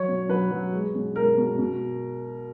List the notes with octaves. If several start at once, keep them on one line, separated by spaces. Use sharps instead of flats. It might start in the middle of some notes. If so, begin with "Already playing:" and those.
Already playing: F#3 C#5
B2
F#3 B4
F#3
G#3
B2
G#3 A#4
B2
B2